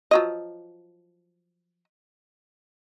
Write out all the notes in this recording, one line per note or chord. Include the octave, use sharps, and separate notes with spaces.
F3 F#3 D#5